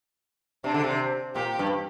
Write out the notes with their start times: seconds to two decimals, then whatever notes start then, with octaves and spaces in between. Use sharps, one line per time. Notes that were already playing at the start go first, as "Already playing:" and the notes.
0.64 C3 D4
0.74 D3
0.84 C3
1.35 A#2 G4
1.59 G2